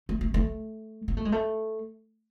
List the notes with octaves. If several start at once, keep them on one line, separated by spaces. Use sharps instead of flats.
A3
A3
A3
A#3
A3
G#3
A3